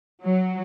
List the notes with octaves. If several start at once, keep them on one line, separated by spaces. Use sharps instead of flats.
F#3